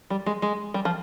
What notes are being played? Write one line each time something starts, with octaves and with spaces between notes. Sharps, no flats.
G3
G#3
G#3
G3
F3